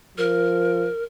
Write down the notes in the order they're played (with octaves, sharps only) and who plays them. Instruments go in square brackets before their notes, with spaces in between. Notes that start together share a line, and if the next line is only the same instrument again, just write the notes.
[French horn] F3 [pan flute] A#4